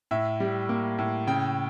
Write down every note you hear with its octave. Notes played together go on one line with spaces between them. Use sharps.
A2 E5
G3
A#3
A2
C#3 G5